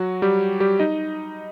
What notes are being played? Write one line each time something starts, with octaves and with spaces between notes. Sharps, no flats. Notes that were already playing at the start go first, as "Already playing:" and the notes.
Already playing: F#3 F#4
G3 G4
G3 G4
D#4 D#5